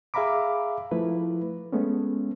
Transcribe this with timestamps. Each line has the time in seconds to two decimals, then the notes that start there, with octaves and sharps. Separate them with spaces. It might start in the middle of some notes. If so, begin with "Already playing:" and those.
0.14 G#4 E5 F5 A#5 B5 D6
0.91 F3 A3 E4 B4
1.72 G#3 A3 B3 C#4